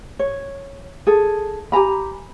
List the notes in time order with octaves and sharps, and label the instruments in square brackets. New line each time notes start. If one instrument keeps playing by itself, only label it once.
[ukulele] C#5
G#4 A4
G4 G#5 A#5 B5